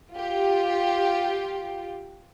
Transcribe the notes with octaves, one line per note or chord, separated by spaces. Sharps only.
F4 G4